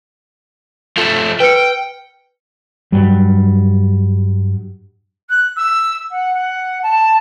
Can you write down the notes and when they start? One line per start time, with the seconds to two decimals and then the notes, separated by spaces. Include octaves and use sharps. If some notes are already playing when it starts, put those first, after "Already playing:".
0.98 F3 A3
1.40 B4 G5 F6 C#7
2.92 G2 F#3 G3
5.28 F#6
5.56 E6
6.11 F#5
6.33 F#5
6.82 A5